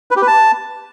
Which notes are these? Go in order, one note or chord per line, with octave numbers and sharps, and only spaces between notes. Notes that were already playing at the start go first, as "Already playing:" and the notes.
B4
G4
B4
A5